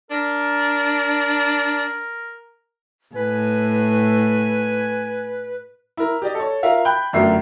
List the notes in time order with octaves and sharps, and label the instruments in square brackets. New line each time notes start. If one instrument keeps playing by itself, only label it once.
[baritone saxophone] D4 [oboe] A#4
[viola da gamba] A2 [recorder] B4 [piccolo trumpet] G#5
[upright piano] E4 A#4
G4 D5 D#5
A4 C#5
F4 A#4 E5 F5
G5 B5 F#6 G6
G1 F#2 A3 A#4 E5 C7